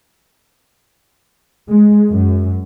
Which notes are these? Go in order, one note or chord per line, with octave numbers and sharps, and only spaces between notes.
G#3
F#2